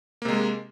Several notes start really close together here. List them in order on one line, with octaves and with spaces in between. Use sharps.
A#3 C3 G#3